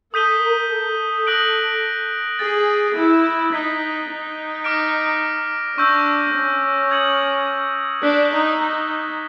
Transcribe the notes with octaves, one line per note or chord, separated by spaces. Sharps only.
A4 D#6 G6 B6 D#7 G7
A#4
A4
D#6 F#6 A#6 D7 F#7
G#4 A6 D7 F#7
E4
D#4 G#6 B6 D#7 G7
D#4
D6 F6 A#6 D7
D4 C#6 E6 G6 A#6
C#4
D#6 G#6 C#7 F#7
D4 F#6 B6 E7 G7
D#4
D#4